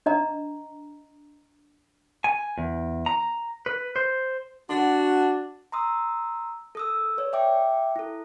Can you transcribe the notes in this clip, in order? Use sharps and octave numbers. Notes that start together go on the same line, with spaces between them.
D4 D#5 A#5
G#5
E2
A#5
B4
C5
D4 F#4
A#5 C6 D#6 E6
A4 D#6 E6
B4 C#5 D5
E5 G5 D6
E4 A4